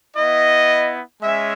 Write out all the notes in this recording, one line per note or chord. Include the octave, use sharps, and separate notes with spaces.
B3 E4 D#5
G#3 C#4 E5